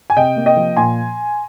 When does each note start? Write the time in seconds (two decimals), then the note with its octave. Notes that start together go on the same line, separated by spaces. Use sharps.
0.10 G#5
0.16 C3 D#5 G5
0.36 A#3
0.46 D#5 G5
0.57 F3
0.77 A#2 G#5 C6